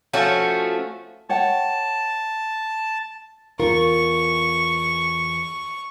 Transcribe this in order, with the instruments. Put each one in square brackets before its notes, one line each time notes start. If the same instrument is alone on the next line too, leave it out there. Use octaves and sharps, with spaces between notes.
[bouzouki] F3 A3 C#4 F#4
[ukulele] C#5 F#5 G5 [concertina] A5
[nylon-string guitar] E2 F4 A#4 [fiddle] C#6